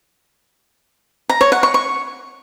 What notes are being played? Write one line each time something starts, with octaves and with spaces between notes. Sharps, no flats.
A#5
C#5
F#5
C#6
C#6